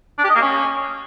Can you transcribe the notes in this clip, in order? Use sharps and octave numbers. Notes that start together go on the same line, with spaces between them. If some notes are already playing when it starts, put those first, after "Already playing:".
D4
G4
D#5
A#3
C#4